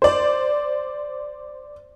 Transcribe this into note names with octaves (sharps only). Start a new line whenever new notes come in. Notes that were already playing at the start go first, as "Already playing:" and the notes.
C5 D5